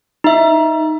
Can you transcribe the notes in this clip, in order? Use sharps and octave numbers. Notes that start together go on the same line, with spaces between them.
D#4 E5